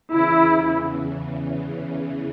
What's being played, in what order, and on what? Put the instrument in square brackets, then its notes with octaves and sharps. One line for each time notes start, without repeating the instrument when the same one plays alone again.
[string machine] E2 C#3 E3 [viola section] E4